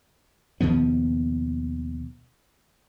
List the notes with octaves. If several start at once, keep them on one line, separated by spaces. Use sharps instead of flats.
D#2 B2 F3 B3